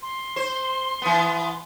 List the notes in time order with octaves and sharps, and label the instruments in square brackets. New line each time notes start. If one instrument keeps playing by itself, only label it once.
[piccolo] C6
[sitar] C5
E3 B3